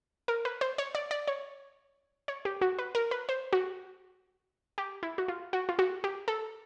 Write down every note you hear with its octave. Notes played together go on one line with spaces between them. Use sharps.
A#4
B4
C5
C#5
D5
D5
C#5
C#5
G4
F#4
B4
A#4
B4
C5
F#4
G4
E4
F#4
F4
F#4
F4
F#4
G4
A4